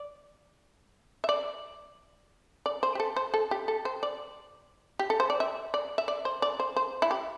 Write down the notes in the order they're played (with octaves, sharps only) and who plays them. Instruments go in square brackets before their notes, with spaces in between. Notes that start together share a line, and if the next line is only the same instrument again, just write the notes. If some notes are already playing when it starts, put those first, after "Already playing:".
Already playing: [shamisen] D5
E5
D5
D5
C5
G4
A4
C5
A4
G4
A4
C5
D5
G4
A4
C5
D5
E5
D5
E5
D5
C5
D5
C5
C5
E4
G4